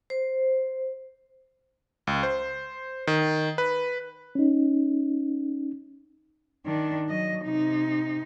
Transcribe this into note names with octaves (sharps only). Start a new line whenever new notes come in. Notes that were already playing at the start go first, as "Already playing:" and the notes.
C5
C#2
C5
D#3
B4
C#4 D#4
D#3 D4
F#3 D#5
C3 D#4